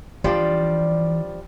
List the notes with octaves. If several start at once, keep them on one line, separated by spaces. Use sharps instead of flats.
E3 F3 G3 D4